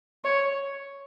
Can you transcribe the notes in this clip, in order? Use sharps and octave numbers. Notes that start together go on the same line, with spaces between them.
C#5